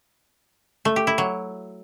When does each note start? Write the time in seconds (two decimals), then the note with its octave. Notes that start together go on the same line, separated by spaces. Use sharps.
0.85 A3
0.96 G4
1.07 E4
1.18 F#3